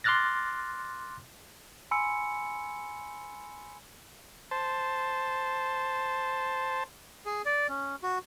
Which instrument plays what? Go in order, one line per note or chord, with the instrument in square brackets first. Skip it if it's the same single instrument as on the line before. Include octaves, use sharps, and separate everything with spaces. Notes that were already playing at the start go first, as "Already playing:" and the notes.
[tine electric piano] C6 D6 F6 F#6 A6 A#6
[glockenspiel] G#5 B5 C6 E6 C#7
[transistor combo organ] C5 A5
[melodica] G#4
D5
C#4
F#4